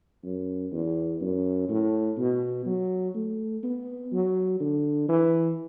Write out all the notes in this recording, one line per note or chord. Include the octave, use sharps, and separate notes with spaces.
F#2
E2
F#2
A2
B2
F#3
A3
B3
F#3
D3
E3